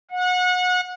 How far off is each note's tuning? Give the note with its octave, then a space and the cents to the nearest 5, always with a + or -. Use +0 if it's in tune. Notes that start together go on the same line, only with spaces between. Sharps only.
F#5 -30